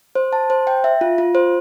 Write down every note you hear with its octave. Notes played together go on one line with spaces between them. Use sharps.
C5
A5
C5
G5
E5
F4
F4
C5